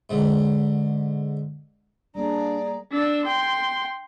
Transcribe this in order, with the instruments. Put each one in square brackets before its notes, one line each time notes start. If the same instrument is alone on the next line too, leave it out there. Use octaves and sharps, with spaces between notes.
[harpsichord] G#2 D3
[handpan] G3 A#3 [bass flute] D4 [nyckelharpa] G#4 A#5 [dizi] D5
[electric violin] D4 E6
G5 C6